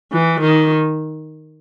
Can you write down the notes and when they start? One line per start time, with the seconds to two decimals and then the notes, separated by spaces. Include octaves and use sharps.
0.12 E3
0.41 D#3